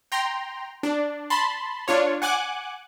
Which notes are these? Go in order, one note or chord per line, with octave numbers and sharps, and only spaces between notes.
G5 A#5 C6
D4
A5 B5 C6
D4 F4 C#5
F#5 G#5 D6 F#6